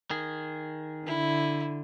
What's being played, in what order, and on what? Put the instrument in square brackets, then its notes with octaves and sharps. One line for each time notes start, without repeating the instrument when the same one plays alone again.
[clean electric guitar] D#3 G#4
[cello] D3 [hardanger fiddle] E4